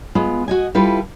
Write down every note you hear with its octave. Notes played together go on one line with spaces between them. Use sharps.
G#3 B3 F4
F#4 D#5 G#5
G3 E4 F4 A4 B4